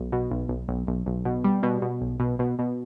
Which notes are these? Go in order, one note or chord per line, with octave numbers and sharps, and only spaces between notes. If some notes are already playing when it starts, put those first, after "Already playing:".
Already playing: B1
B2
B1
B1
B1
B1
B1
B2
G3
B2
B2
B1
B2
B2
B2